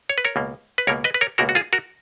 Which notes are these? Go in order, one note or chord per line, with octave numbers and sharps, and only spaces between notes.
C#5
B4
A#4 C#5
C#2 B2 A#3
B4
C#2 B2 A#3 A#4 C#5
B4 D#5
B4
A#4 C#5
C#2 B2 A#3 F#4 A#4
F#4
F4 G#4
F#4 A#4